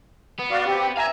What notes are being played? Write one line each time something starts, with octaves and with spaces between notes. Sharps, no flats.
B3
F#4 D5 F5
C4 G4
E5 F5 G#5 A#5